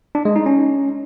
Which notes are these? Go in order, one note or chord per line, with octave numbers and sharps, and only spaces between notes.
D4
G#3
D#4
C#4